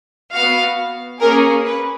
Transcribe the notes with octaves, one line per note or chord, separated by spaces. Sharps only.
B3 F#4 F5
A#3 C#4 G#4 A#4
B4